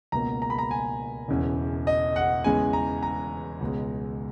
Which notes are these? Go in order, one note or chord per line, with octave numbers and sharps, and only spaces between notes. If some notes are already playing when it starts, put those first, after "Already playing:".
C#2 B2 A#3 A#5
A#5
B5
A#5
G#5
E1 E2 C#3
D#5
F#5
E2 C#3 G#3 B3 G#5
A#5
A#5
C#2 B2 G#3